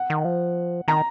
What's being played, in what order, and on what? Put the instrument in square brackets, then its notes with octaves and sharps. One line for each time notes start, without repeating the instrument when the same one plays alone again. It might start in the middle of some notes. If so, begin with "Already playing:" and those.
Already playing: [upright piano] F#5
[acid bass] D#3
F3
[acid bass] D#3 [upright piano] A#5